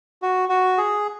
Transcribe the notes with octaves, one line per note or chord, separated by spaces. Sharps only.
F#4
F#4
G#4